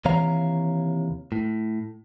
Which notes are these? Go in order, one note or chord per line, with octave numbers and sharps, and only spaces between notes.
D#2 C3 E3 C#5 F5 A#5
A2